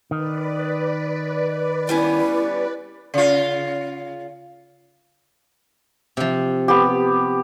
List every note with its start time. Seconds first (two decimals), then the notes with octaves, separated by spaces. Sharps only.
0.11 D#3 B4 D5
1.89 G3 B3 C#4 E4
3.14 C#3 F4
6.17 C3 F3
6.68 B3 G4